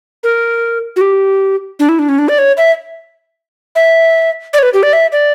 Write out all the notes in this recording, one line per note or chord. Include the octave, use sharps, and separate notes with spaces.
A#4
F#4
G4
D4
E4
D4
C#4
D4
D5
C#5
E5
E5
D5
C#5
B4
G4
D5
E5
D5